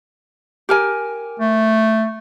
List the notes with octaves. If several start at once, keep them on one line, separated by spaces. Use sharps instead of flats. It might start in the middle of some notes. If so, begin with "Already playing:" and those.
G4 A#4 G#5
A3